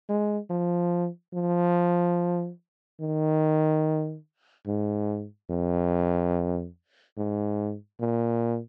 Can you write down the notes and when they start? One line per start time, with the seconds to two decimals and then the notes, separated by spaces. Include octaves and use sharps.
0.09 G#3
0.50 F3
1.34 F3
3.00 D#3
4.67 G#2
5.50 F2
7.17 G#2
8.00 A#2